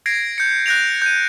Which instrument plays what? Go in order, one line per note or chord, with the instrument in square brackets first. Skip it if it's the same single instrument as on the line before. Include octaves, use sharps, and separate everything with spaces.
[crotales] G#6 A#6 C7 D7
G6 C#7
F#6 G6 A#6 D7 F7
G6 D#7